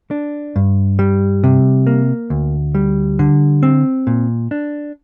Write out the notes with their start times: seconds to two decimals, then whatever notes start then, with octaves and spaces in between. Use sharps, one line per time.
0.11 D4
0.56 G2
0.99 G3
1.44 C3
1.87 A#3
2.30 D2
2.75 G3
3.19 D3
3.63 C4
4.07 A#2
4.51 D4